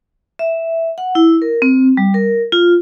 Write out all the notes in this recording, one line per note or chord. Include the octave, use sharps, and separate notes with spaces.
E5
F#5
E4
A#4
C4
G3
A#4
F4